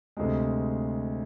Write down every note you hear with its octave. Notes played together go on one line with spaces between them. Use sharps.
D2 C3 G#3